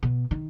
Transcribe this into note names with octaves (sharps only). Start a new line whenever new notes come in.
B2
D#3